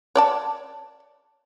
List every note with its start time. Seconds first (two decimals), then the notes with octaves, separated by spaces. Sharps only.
0.15 C#5 D5 A5